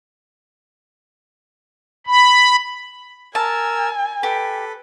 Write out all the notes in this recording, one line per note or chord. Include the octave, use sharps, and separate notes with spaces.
B5
A#4 G#5 A5 E6
G4 A4 B4